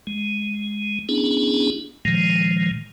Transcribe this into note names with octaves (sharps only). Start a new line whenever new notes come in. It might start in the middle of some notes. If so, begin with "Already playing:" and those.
G#3
B3 C#4 D4 E4 G#4
A#2 D#3 F3 G#3